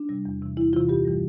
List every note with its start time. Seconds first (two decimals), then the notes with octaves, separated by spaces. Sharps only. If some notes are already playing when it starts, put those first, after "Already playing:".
Already playing: D4
0.09 C3 G3
0.25 E2
0.42 C3 E3
0.57 E2 E4
0.73 C3 E3 F4
0.89 G2 G4
1.05 E3 G3